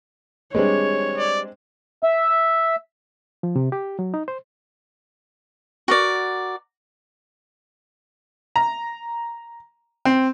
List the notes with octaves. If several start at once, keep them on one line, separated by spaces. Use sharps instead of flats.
G3 G#3 C4 D4 G#4 B4 C#5
D5
E5
F3
C3
G4
F#3
D#4
C5
F#4 A#4 D5
A#5
C4